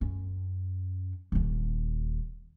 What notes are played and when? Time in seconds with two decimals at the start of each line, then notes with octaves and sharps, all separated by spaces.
0.01 F#2 C#4
1.32 D#1 D#2